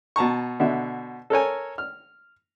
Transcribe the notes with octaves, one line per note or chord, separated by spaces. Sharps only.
B2 A5 A#5 C#6
B2 D3 E5
A4 A#4 C#5 G#5
F6